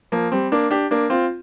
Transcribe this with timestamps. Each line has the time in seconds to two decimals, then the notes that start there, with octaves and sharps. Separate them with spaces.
0.12 F3 A#3
0.32 G3 C4
0.52 A#3 D4
0.71 D4 G4
0.91 A#3 D4
1.10 C4 F4